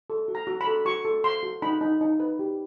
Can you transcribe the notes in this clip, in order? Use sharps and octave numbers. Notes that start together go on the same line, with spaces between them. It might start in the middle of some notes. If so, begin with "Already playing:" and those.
A4
F#4
A#5
F#4
B5
A4
F#4 C#6
A4
A4 C6
F#4
D#4 B5
D#4
D#4
B4
G4